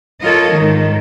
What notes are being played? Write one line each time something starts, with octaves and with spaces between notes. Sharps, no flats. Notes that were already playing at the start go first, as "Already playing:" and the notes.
F4 A4 A#4 C#5 D#5
G#2 D#3